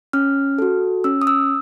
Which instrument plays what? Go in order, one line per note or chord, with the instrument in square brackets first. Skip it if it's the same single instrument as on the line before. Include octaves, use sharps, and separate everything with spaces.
[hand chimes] C#4 F6
F#4 A4
C#4 E6
D#6
E6